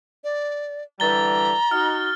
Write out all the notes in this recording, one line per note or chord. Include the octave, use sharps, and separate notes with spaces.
D5
D3 E3 G3 A#5 A6 G7
D#4 F#4 F6